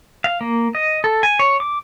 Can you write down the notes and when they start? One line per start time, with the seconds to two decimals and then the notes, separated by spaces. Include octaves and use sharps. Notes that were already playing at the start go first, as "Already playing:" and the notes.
0.24 F5
0.41 A#3
0.75 D#5
1.04 A4
1.23 G#5
1.39 C#5
1.60 D6